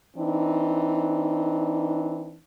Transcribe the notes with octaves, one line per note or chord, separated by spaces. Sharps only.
E3 C4 D4 D#4